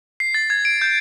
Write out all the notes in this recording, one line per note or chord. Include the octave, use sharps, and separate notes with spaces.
C7
A6
G#6
D7
G6